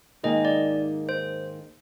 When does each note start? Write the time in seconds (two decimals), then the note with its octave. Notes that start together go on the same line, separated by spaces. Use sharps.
0.23 G#2 D#3 A#3 D#4 G#4 D#5
0.45 D5
1.09 C5